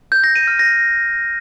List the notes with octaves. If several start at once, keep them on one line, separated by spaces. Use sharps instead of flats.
G6
A#6
D#7
F6
A#6